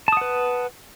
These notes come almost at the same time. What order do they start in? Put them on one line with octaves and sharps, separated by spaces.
A5 D#6 F#5 B4